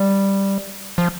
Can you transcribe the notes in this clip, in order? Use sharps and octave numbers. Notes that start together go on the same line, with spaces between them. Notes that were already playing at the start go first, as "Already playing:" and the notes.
Already playing: G3
F3